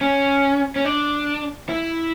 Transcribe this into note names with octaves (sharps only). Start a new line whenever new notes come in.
C#4
C#4
D4
E4